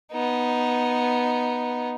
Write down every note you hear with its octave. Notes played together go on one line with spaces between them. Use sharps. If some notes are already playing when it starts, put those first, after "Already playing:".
B3 D#4